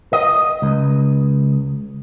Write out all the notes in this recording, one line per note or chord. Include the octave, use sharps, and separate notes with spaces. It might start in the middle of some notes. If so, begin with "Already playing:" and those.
D#5
C#2